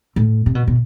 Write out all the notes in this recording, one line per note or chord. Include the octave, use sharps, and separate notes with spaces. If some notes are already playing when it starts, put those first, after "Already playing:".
A2
C3
B2
B2